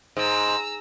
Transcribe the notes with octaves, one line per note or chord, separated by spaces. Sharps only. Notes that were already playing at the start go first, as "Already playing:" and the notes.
G#2 A#5 E6